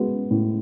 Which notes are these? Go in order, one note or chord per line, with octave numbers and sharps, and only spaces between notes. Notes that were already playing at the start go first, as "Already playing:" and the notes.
Already playing: G#3 B3 F#4
A2